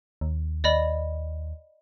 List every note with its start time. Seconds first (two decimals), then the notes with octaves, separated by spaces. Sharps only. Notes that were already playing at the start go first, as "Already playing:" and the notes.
0.21 D#2
0.64 D#2 D5 D#5 B5